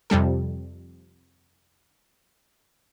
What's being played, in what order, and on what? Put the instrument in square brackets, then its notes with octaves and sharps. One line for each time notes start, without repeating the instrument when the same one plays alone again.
[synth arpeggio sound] F2 C3 G3 A4